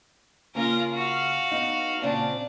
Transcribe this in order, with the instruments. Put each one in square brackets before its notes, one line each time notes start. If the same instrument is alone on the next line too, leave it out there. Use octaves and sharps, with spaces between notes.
[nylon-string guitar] C#3 A#3 C#4 [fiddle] F4 A#4
[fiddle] F#4 F5
[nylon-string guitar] B3 D#4
[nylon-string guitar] A#2 C#3 C4 [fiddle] D4